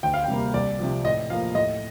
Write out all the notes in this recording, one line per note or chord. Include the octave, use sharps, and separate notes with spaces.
D2 G5
F5
G5
C3 G3 A#3
C2 D5
C3 F3
A2 D#5
F3 A#3 F5
A2 D#5